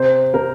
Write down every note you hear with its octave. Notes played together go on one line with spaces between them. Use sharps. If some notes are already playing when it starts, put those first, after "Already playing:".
Already playing: C3 C5
C3 A#4